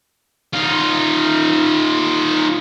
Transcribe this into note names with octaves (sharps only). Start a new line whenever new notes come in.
D#4 F4